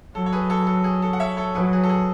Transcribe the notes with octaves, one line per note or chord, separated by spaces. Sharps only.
F#3 A4
C#5
G#4 B4
A4 C#5
A4
G#4
A4
F#5
C#5 E5
A4 C#5
F#3 G#4 B4
G#4 B4
A4
G#4